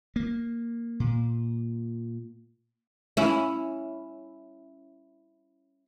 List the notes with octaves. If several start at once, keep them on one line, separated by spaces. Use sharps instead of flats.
A#3
A#2
C#4 E4